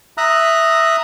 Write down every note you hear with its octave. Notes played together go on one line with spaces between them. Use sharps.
E5 A#5 D#6 F#6